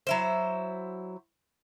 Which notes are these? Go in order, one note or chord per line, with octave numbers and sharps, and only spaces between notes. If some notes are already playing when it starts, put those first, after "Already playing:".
F#3 E4 C5